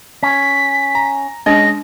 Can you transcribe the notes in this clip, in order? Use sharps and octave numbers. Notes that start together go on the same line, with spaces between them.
C#4 B6
A#5
G#3 C#4 D4 D#5 A#6